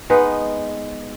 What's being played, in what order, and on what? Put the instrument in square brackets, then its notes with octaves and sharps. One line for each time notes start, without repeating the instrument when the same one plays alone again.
[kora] G#3 B3 D#4 B4